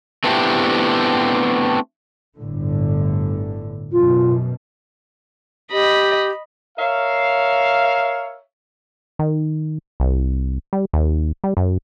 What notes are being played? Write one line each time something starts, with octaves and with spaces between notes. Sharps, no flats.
A3 B3 C4 D4 E4 G4
G1 A2 D3
F#2 B2 F4
G4 D#5 B5
A#4 C#5 E5 F5
D#3
C2
G3
D#2
G3
F#2